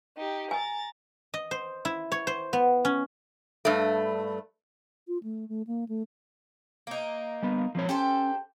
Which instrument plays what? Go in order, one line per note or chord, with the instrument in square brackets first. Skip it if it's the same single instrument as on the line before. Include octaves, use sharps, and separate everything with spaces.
[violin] D#4 G4
[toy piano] G#5 [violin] A#5 A6
[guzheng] D#5
C5
E4
C#5
C5
B3
C#4
[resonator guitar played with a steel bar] G2 A3
[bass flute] F4
A3
A3
A#3
A3
[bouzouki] A#3 D#4
[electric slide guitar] G3 B3
F3 C4 C#5
[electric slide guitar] C#4 [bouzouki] G4 A4 C5